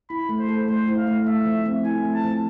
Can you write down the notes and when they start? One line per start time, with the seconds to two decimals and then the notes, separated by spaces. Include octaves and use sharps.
0.10 E4 B5
0.29 A3
0.39 C5
0.49 A4
0.68 A3 C5
0.88 E4
0.97 F5
1.07 A3
1.27 A3 E5
1.46 F3
1.65 C4
1.85 E4 G#5
2.04 A3
2.14 A5
2.24 F3